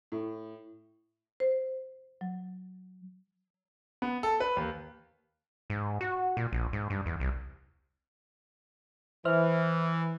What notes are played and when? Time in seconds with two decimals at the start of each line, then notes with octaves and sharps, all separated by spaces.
0.12 A2
1.40 C5
2.21 F#3
4.02 B3
4.23 A4
4.40 B4
4.57 D#2
5.70 G#2
6.01 F#4
6.37 A#2
6.53 A#1
6.73 G#2
6.90 G2
7.06 E2
7.20 C2
9.25 E3 C5 E5 F6